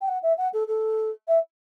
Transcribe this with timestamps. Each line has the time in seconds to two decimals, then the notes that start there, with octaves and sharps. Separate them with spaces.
0.01 G5
0.08 F#5
0.23 E5
0.38 F#5
0.53 A4
0.68 A4
1.28 E5